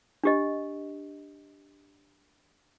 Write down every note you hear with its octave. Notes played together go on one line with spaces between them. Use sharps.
D4 G4 D#5